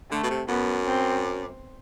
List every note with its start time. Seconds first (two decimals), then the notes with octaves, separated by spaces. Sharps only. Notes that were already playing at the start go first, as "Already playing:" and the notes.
0.11 D3 A3
0.23 B2
0.30 C3
0.48 F#2 B3
0.86 C4